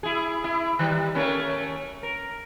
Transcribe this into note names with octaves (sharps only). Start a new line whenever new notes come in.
E4 G#4
E4
D#3 G3
A3 A#3 C#4
A#4